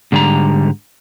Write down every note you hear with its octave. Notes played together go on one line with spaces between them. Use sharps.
G#2 D3 G3 G#5 A#5